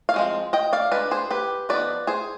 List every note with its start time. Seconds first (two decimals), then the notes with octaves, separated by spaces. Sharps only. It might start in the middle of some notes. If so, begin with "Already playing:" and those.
0.09 F5
0.14 F3 G#3 C4
0.53 D#5 G5
0.73 D5 F5
0.91 G#3 D4 B4 D5
1.11 G#4 C5
1.31 G4 B4
1.69 F3 B3 D#4 B4 D5
2.07 G#4 C5